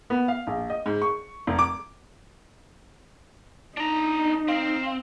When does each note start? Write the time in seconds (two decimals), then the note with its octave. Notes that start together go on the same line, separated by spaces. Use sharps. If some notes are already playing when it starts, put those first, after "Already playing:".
0.10 B3
0.28 F5
0.47 A#1
0.70 D#5
0.86 G#2
1.02 C#6
1.47 F1
1.59 D6
3.77 D4 D#4 A#5
4.48 C4 F5